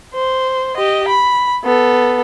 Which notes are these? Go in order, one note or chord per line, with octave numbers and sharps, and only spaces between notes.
C5
G4 D#5
B5
B3 A4